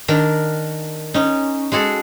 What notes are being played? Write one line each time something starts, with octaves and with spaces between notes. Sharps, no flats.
D#3 D4 A#4
C#4 D#4
G#3 F#4 G#4 A4